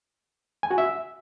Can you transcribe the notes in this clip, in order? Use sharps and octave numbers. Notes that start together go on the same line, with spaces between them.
G#5
F#4
E5